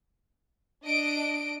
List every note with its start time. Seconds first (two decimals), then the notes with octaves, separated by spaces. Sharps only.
0.84 D4 D#5 D7